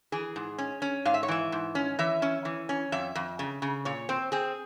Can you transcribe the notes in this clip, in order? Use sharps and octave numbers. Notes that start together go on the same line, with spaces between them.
E3 G#4
G#2
C#4
C#4
G#2 F5
E5
C#5
E3 E5
G#2
C#4
E3 E5
C#4
E3
C#4
F2 E5
F2
C#3
C#3
A#2 C#5
C4 C5
C4 G#4